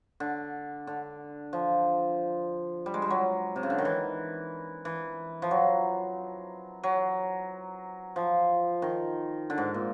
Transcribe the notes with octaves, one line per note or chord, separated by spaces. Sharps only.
D3
D3
F3
G3
G#3
G3
F#3
C3
C#3
D3
D#3
E3
E3
F3
F#3
F#3
F3
D#3
D3
G#2
A#2